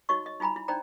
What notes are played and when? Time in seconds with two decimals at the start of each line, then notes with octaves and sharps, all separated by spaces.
0.09 D#4 F#4 C#5 D#5 C#6
0.26 D#5
0.40 D#4 F4 G#5 A#5 B5
0.56 E4
0.68 D4 D#4 C5 D5 G5 A#5